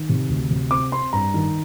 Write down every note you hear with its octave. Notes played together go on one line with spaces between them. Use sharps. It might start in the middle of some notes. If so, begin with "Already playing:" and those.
Already playing: D#3
C3
D2
C3
C4 D6
C4 C6
G2 A#5
D#3